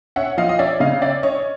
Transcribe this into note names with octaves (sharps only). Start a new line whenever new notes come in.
C#4 E5 F#5
F3 D#5 F5
D#5
C#4 D5 E5
C#3 D#5 F5
C#4 D5 E5
C#4 C#5 D#5